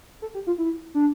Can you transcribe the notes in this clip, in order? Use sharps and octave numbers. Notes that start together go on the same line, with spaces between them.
A4
G4
F4
E4
D4